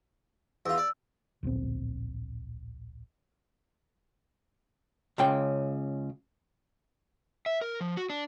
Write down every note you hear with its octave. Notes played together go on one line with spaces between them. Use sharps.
E2 F4 E6
D5
D1 A#1 B3 C4
C#2 C#3 G5
E5
A#4
F3
F#4
D4